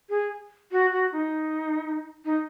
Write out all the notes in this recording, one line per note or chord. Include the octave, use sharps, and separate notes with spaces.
G#4
F#4
F#4
D#4
D#4